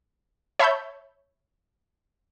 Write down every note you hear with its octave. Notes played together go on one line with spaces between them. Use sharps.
C#5 E5 A5 B5 E6 G6